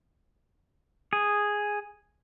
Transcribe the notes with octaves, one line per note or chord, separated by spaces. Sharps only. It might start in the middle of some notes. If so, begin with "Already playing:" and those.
G#4